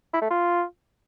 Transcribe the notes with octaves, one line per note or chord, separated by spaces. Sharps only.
E4
A3
F4